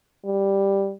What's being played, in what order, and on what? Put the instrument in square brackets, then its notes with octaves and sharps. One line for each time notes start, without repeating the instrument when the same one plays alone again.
[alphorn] G3